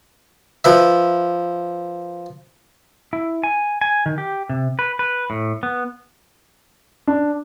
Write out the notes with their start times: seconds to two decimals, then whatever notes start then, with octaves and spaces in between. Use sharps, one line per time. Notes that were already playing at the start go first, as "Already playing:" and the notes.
0.64 F3 B4 E5
3.13 E4
3.43 G#5
3.81 G#5
4.06 D#3
4.18 G4
4.49 C3
4.79 B4
4.99 B4
5.30 A2
5.63 B3
7.07 D4